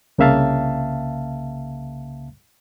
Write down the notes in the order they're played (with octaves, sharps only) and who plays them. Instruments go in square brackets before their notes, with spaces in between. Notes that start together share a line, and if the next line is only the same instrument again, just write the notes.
[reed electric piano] C2 C#3 A#3 E5 F5 A5